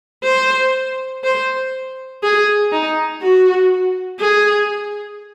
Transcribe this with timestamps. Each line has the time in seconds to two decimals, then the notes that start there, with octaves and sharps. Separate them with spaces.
0.24 C5
1.24 C5
2.23 G#4
2.72 D#4
3.22 F#4
4.20 G#4